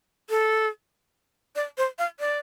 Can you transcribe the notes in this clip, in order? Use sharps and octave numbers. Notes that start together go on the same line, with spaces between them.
A4
D5
C5
F5
D5